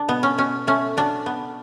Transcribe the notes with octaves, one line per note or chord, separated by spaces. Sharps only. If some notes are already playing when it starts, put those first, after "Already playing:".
Already playing: D4
B2 B3
C#4
B2 C#4
A3 C#4
F#3 D4
B3